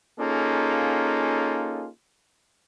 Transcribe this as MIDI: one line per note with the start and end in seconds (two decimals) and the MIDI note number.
0.19 1.88 58
0.19 1.88 61
0.19 1.88 63
0.19 1.88 65
0.19 1.88 68
0.19 1.88 69